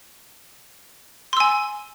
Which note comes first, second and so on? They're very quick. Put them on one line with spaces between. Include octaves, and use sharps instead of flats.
C6 E6 G#5